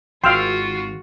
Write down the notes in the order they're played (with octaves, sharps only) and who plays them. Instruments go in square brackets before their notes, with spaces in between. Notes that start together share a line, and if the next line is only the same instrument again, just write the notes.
[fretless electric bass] G#1 [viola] F4 F#4 [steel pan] F5 G5 [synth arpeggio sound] C6 E6 F6